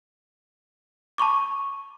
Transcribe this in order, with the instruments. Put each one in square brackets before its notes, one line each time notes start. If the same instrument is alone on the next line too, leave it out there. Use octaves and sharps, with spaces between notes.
[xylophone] A5 B5 C#6 D6